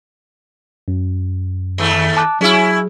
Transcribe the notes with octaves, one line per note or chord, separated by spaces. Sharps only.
F#2
D#2 A3
A5 D6 F#6
F#3 C#4 E4 G#4